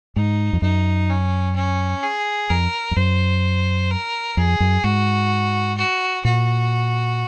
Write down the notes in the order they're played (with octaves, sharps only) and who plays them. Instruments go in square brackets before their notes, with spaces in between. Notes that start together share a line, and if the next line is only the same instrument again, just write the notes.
[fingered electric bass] G#2 [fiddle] D#4
[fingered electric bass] F2
[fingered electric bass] F#2 [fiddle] D#4
[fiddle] C#4
C#4
G#4
[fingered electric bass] F2 [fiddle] A#4
[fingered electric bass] F2
[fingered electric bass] F#2 [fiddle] C5
[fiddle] A#4
[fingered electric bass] F2 [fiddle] G#4
[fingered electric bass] F#2
[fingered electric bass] G#2 [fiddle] F#4
[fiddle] F#4
[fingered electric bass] A#2 [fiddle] F#4